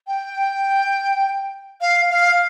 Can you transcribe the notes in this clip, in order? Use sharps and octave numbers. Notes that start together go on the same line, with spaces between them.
G5
F5
F5